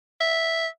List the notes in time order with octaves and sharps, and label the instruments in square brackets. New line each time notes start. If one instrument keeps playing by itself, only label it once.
[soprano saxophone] E5